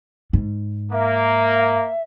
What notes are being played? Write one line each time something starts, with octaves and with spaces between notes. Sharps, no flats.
G#2
A#3 E5